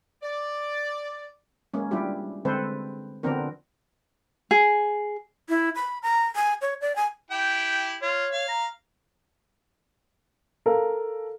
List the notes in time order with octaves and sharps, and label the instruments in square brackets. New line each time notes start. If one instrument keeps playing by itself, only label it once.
[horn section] D5
[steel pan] G#3 A#3 C#4
G3 D4 E4 F4 G4
D3 G#3 C4 A4 B4 C5
D3 F3 B3 C4 D4 A#4
[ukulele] G#4
[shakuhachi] E4
B5
A#5
G#5
C#5
D5
G#5
[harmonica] E4 G4 G5
[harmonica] F4 [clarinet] C#5
[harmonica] F5
[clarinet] A#5
[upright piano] A4 A#4 F5